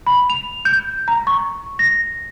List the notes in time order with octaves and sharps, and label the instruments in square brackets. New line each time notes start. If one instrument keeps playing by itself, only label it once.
[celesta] B5
F7
G6
A#5
C#6
A#6